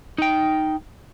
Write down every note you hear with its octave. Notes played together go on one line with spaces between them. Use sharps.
D#4 G5